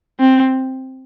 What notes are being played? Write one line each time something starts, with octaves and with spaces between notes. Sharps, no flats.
C4